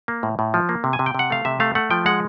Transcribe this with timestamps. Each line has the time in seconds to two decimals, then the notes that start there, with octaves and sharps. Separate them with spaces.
0.08 A#3
0.23 A2
0.39 A2
0.54 F3
0.69 A#3
0.84 C3
0.93 G#5
0.99 C3
1.06 G5
1.15 C3 F#5
1.30 A3 F5
1.45 C3 E5
1.60 A3 F5
1.75 A3 F#5
1.90 F3 G5
2.06 G#3 F#5